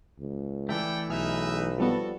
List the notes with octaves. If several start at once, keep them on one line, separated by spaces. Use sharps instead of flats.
C#2
E3 A3 A4 D5 G5
B1 D#4 G#4 B4 E5 F6
F3 G3 B3 F#4 A4